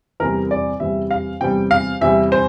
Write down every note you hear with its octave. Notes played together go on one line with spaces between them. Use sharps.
E2 C3 G3 A#4
D5
E2 C3 G3 E5
F5
E2 C3 G3 G5
F5
E2 C3 G3 E5
C5